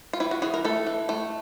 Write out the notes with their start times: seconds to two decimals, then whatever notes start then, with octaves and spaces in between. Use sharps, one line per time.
0.13 F4
0.20 E3 E4
0.31 F#4
0.42 E3 G#4
0.54 A#4
0.65 A3 A4
0.86 E3
1.09 A3